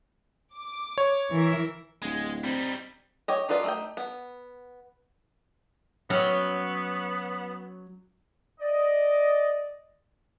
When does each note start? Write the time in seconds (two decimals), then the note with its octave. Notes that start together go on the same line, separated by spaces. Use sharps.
0.54 D6
0.98 C#5
1.32 E3 A#4 E5
2.02 D1 G#3
2.44 G3 C4 D#4
3.28 G4 C#5 D#5
3.49 D4 D#4 F4 B4 D5
3.64 A3 D#4 G5
3.97 B3
6.10 F#3 B3 C#4
8.60 D5 D#5